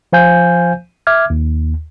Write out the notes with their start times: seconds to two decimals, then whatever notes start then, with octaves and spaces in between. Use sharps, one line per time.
0.13 F3 C5 F5 G#5 G6
1.07 E5 D6 F6 G#6
1.30 D#2